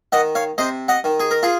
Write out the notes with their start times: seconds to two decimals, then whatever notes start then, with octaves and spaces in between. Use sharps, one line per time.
0.12 D#3 D#5 F#5
0.35 C#5 F5
0.58 C3 C5 D#5
0.88 D#5 F#5
1.04 D#3
1.20 G#4
1.31 A#4
1.43 F4 G#4